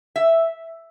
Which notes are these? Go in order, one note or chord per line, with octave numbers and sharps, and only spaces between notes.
E5